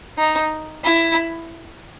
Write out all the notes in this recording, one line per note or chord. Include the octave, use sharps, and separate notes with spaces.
D#4
E4